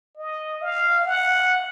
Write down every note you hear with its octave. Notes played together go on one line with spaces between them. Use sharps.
D#5
F5
F#5